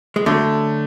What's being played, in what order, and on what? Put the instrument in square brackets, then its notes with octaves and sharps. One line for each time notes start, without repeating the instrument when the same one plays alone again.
[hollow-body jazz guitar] G#3
[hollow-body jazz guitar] D3 F#3 [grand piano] A3